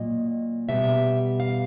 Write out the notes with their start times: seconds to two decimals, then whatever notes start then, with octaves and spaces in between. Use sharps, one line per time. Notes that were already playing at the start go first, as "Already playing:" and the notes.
Already playing: A#2 F#3 D#5
0.69 B2 G3 E5
1.40 F5